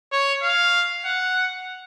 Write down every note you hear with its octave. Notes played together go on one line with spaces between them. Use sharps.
C#5
F5
F#5